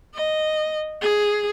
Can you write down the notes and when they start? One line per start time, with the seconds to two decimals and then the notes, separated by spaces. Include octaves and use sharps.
0.15 D#5
1.02 G#4